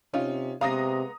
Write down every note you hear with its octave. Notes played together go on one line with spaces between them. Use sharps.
C3 C#4 D#4 F4
C3 G#3 B3 F5 A#5 D#6 A#6